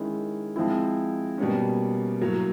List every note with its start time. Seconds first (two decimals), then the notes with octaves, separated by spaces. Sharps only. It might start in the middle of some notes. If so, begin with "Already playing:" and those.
Already playing: D#3 G#3 C#4 E4
0.56 F3 G#3 C4 E4
1.38 B2 G3 A#3 C#4
2.21 A2 F#3 A#3